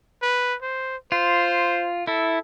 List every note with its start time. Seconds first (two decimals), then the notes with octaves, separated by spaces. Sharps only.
0.22 B4
0.62 C5
1.12 F4 C5
2.07 E4 A4